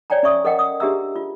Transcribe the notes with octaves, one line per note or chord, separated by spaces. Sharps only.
C#5 D5 G5 G#5 A#5
C#4 D5 E5 C#6 D#6
A4 A#4 D#5 F#5 G5
D#6
D4 G4 G#4 E5 A#5 E6
F4